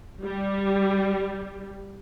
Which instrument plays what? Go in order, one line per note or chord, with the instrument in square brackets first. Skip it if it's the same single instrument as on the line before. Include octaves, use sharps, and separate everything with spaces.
[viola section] G3